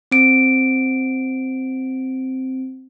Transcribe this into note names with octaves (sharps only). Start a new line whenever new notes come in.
C4 D7